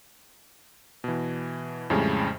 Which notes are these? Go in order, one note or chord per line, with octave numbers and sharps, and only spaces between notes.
B2 E3
F2 A2 C#3 G3 G#3